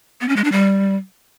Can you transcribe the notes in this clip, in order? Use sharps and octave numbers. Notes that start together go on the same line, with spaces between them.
B3
C#4
G#3
D4
G3